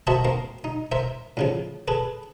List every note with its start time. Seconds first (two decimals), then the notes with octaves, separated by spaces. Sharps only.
0.07 F#4 A#4 C5 D#5 E5 A5
0.25 A#3 C4 A#4
0.64 D#4
0.92 A#4 C5 E5
1.37 A2 C#3 F3
1.88 G#4 A4 B4